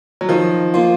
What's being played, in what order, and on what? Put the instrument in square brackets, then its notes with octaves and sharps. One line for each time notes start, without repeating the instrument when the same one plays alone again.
[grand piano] F#3
[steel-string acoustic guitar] D#3 [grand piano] F3
[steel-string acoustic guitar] A#3 F4